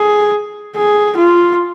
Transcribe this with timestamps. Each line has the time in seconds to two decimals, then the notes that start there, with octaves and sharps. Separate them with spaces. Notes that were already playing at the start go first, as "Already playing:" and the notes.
Already playing: G#4
0.76 G#4
1.17 F4